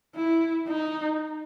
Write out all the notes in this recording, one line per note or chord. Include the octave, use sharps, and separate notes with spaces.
E4
D#4